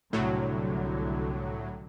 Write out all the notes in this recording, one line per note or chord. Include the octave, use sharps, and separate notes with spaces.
C2 A2 D3 F#3